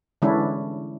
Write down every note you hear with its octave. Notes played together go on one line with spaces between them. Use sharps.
D3 E3 G#3 C#4 D4 E4